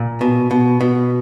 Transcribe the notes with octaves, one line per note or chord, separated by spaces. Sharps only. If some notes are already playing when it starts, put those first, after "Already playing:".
Already playing: A#2
B2
B2
B2